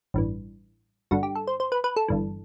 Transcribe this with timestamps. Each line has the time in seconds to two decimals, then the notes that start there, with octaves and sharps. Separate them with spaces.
0.14 A1 G2 E3
1.11 G1 G2 D3 F#4
1.23 G4
1.35 A4
1.47 C5
1.60 C5
1.72 B4
1.84 B4
1.96 A4
2.08 G1 G2 E3